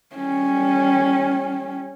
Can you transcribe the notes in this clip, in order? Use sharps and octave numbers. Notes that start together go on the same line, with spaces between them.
G3 C#4